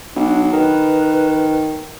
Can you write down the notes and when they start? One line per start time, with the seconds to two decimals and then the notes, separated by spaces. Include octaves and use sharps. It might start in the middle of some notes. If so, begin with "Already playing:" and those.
0.16 B1 D4
0.53 D#3 B4